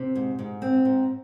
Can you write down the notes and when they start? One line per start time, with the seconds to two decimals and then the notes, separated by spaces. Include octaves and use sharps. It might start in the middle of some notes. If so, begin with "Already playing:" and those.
Already playing: C3
0.16 G#2
0.39 G#2
0.62 C4
0.85 G#2